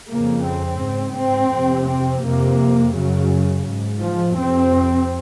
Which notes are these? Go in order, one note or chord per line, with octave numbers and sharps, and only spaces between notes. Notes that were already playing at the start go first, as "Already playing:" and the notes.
F2 C#3 A#3
C4
G#2
C4
F2 C3
C4
F2 C3 A#3
F#2 C#3 F#3
G#2
F3
F2 C3 C4